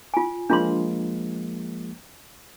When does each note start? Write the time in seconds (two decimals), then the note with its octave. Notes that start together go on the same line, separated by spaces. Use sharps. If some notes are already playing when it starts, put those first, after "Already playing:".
0.14 F4 G#5
0.50 F3 G#3 A#3 D4 F4 C6